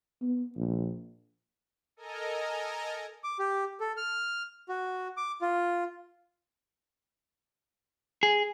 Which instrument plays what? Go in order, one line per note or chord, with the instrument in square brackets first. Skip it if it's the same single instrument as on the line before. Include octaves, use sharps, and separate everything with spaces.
[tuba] B3
A#1
[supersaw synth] A4 A#4 D#5 G#5 A#5
[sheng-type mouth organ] D6
G4
A4
F6
F#4
D6
F4
[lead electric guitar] G#4